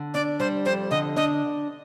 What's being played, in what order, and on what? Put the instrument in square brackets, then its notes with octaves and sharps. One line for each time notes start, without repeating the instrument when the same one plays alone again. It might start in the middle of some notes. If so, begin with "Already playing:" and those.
Already playing: [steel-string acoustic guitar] D3
[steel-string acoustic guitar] D4 [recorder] D5
[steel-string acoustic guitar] G3 [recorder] C5
[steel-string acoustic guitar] F2 [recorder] C5
[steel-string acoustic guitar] D3 [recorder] D#5
[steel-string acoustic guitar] D4 [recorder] D#5